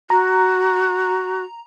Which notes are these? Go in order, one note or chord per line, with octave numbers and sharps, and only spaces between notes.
F#4 A#5